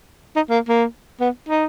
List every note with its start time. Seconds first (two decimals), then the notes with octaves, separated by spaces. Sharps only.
0.36 D#4
0.50 A#3
0.68 A#3
1.20 B3
1.49 D#4